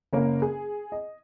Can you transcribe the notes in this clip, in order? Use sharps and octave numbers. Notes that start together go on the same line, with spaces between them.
F#1 A#3 C#4 A#4
G#4
D#5